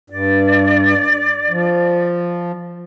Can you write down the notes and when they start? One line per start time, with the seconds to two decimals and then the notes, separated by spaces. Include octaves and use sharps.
0.10 G2 D5
1.50 F3